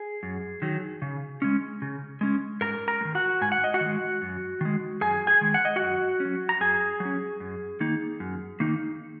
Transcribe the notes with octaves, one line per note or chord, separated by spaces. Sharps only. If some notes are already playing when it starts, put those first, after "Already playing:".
Already playing: G#4
F#2
D#3 F#3
C#3
G#3 C#4
C#3
G#3 C#4
G#2 A#4 A#5
A#4 A#5
G#3
D#3
F#4 F#5
G#2 G#5
F#5
D#5
F#4 F#5
D#3
G#3
F#2
D#3 G#3
F#2 G#4 G#5
G#4 G#5
D#3 G#3
F#5
D#5
F#2 F#4 F#5
C#4
F#3
A#5
F#2 G#4 G#5
F#3
C#4
F#2
D#3 A#3 D#4
F#2
D#3 A#3 D#4